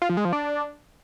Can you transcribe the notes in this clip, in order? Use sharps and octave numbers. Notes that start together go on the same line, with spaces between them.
F4
F3
G#3
F3
D4